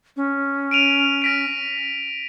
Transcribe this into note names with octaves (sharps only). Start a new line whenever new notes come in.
C#4
D7 D#7 F7
A#6 B6 D7